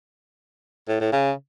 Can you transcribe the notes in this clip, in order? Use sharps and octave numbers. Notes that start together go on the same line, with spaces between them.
A2
A2
C#3